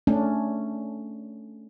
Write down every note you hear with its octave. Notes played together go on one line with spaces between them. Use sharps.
A3 C#4 D4